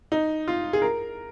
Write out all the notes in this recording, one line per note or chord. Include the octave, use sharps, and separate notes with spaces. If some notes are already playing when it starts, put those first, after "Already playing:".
D#4
F4
G#4
A#4